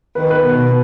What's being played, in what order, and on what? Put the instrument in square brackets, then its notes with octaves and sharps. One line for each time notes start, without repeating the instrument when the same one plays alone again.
[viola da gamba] D#3 [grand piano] B4
[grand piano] B4
[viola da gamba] B2